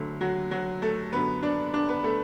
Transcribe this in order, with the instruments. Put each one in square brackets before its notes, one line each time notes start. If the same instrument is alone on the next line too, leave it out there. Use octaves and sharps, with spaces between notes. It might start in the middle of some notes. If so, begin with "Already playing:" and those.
Already playing: [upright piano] D2 D3 F#3 A3
F#3 F#4
F#3 F#4
A3 A4
F#2 D3 F#3 B3 B4
D4 D5
D4 D5
B3 B4
A3 A4